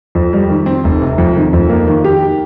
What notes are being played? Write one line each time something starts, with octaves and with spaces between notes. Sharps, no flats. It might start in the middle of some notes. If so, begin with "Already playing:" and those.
F2
G3
D#3
C4
F1
C3
F2
D#3
F2
A#3
D#3
G4